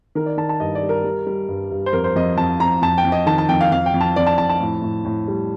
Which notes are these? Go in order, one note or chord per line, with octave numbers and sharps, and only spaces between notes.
D#3 A#4
D5
D#3 A5
A5
G2 D#5
D5
G3
A#4
G3
G3
G2
G2
C5
F2 A#4
C5
F2 D#5
F2 A5
F2 A#5
F2 A5
G5
F2
D#5
D#3 A5
A5
F2 G5
F5
F2 F5
G5
F2
A5
F2 D5
A5
F2 A5
A5
A2
A2
A2
G3